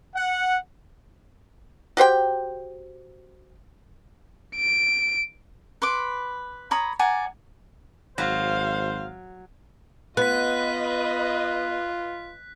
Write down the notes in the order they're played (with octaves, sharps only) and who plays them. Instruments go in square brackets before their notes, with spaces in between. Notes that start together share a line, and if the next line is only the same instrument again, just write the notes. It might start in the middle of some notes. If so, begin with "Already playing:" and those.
[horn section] F#5
[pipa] F#4 G4 C5 G5
[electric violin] D7
[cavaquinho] B4 C6 D6
C#5 A#5 B5 D#6
D5 F#5 G#5 A#5
[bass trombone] G#1 [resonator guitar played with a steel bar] F#3 [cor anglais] C5 [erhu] F5
[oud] B3 [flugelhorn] F4 [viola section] B4 D#5 [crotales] F#6 B6